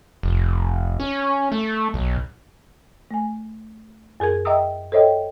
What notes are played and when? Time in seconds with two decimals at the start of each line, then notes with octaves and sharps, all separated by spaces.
0.23 F1
1.00 C#4
1.52 A3
1.94 B1
3.11 A3 G#5
4.20 F#2 G#4 A#4 G#6
4.45 D#5 E5 G5 A#5 D#6 E6
4.92 A4 C5 C#5 D#5 E5 G5